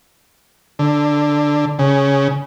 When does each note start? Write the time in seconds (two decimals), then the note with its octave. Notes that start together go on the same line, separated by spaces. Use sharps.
0.79 D3
1.79 C#3